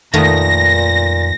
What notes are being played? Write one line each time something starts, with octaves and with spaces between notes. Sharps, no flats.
F2 A#2 D#3 A3 B3 A#6